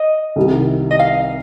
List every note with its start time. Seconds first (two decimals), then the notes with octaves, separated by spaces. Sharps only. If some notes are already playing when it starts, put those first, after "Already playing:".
Already playing: D#5
0.36 C2 C3 D#3 G3
0.91 D#5
0.99 F5